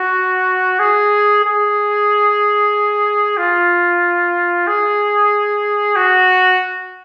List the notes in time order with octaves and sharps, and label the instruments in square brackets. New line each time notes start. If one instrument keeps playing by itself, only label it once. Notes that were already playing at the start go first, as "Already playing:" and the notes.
Already playing: [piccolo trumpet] F#4
G#4
G#4
F4
G#4
F#4